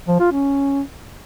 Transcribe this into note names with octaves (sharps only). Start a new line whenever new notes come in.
F3
F4
C#4